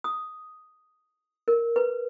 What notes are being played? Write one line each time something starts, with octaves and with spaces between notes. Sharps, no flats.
D#6
A#4
B4